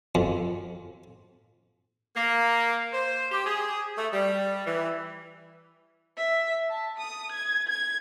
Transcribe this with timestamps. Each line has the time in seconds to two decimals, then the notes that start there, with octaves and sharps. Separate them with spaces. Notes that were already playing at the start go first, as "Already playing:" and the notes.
0.15 F2
2.15 A#3
2.92 C5
3.31 G4
3.46 G#4
3.97 A3
4.12 G3
4.65 E3
6.17 E5
6.70 A5
6.98 D#6
7.32 G#6
7.68 G#6